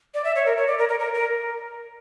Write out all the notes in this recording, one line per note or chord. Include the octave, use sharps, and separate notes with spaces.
D5
E5
C#5
A#4
C#5
D5
A#4
A#4
A#4
A#4